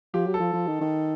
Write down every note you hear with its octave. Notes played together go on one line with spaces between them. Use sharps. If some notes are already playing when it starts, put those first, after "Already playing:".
F3 G4
F#3
A4
F3
F3
D#3
D#3